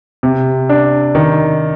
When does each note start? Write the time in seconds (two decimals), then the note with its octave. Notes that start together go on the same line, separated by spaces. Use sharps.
0.23 C3
0.69 D4
1.15 D#3